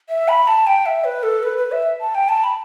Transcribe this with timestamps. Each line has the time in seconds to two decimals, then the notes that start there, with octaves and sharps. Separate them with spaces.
0.09 E5
0.28 B5
0.48 A5
0.67 G5
0.86 E5
1.04 B4
1.23 A4
1.43 B4
1.57 B4
1.72 E5
2.01 A5
2.15 G5
2.29 A5
2.44 B5